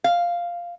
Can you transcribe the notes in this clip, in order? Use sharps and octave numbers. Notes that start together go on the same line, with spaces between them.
F5